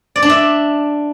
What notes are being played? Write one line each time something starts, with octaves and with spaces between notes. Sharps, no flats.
D5
D4
E5